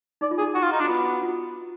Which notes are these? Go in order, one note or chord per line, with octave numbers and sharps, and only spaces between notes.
D#4 D5
F4
G#4
D#4
D#4 F#4
F4
D#4
D4
F#4
B3 F4
F#4
F#4
F4